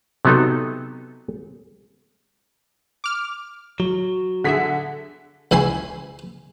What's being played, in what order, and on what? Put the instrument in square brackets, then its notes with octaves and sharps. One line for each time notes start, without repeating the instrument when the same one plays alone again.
[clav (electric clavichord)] C3 F#3 B3 D#4 A4
[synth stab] D6 F6
[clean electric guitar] F#3
[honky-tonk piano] D3 B6 [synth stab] F#4 G#4 E5
[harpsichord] C#2 E4 G#5 B5 C6